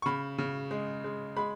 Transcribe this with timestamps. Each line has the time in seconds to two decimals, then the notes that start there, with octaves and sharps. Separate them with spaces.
0.02 C#6
0.06 C#3 B5
0.38 C#3
0.71 G#3
1.04 G#3
1.36 G#3 B5